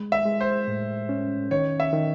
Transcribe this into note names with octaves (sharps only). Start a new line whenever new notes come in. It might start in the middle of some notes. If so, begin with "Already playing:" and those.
Already playing: G#3
E5
G#3
C5
A2
C#4
D#3 C#5
E5
D#3